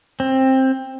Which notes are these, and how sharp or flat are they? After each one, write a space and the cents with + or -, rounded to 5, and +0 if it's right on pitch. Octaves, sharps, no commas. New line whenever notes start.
C4 +15